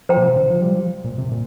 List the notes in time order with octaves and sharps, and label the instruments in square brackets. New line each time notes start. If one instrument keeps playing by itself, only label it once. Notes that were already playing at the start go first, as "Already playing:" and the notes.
[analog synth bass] F3 [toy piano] C5 G5 A#5
[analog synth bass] A#2
C3
D3
F3
G3
F3
A#2
C3
A#2